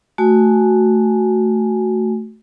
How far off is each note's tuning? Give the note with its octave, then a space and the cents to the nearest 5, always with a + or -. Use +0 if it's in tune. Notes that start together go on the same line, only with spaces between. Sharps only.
A3 +0 F#4 +0 G#5 +0